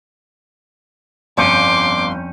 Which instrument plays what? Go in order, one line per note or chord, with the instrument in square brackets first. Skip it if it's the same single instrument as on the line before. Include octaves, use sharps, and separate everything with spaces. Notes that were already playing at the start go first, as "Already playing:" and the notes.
[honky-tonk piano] G1 G6 C#7 [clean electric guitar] F2 C#4 [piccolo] C6 [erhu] D6